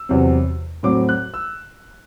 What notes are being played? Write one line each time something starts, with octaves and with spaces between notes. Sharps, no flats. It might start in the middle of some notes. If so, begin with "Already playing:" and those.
Already playing: E6
E2 C3 F#3 C4
A2 F#3 C4 D6
F#6
E6